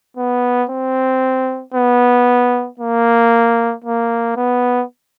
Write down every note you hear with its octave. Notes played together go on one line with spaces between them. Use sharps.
B3
C4
B3
A#3
A#3
B3